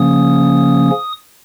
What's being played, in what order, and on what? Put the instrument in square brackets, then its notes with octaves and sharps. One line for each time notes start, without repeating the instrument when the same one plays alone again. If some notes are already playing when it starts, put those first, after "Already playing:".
Already playing: [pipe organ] C#3 F3 A#3 C#4 D#6